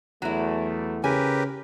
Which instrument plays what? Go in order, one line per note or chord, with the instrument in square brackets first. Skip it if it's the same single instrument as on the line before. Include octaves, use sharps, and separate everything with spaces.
[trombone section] E2 A3 [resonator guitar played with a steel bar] F#3 E4
[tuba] C#3 [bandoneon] G4 A#4 B4 [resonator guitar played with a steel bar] G#5